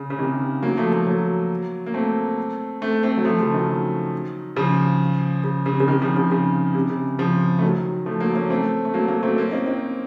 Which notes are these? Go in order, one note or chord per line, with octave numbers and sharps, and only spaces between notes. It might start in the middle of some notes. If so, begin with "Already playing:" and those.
Already playing: C#3
C#3
C3 D#3
F#3 A#3
F3 A3
F3 A3
F#3 A#3
A#3
A3 C4
A3 C4
A3 C4
F#3
F3 A3
C#3 F3
D#3 F#3
C#3 F3
C#3
C#3
C3
C#3
C3 D#3
C#3 F3
C#3 F3
C#3
C3
C#3
C#3 F3
A3
D#3 F#3
F3 A3
F#3 A#3
A#3 C#4
A3 C4
A3
F#3 A#3
F#3 A#3
A3 C4
A#3 C#4
C4 D#4
C4 D#4